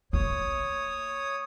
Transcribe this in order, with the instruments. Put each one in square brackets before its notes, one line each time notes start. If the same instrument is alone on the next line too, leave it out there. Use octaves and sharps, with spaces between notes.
[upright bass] A#3 [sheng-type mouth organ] C#5 D#6